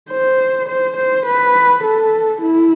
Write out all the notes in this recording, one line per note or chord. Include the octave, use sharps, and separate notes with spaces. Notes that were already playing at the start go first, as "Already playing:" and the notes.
C5
C5
C5
B4
A4
E4